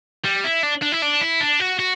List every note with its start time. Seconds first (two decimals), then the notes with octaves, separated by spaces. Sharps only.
0.25 G3
0.44 E4
0.63 D4
0.82 D4
0.92 E4
1.02 D4
1.21 E4
1.41 D4
1.60 F#4
1.79 F#4